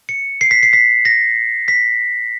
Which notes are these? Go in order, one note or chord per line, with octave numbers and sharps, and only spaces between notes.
C#7
C7
B6
C7
B6
A#6
B6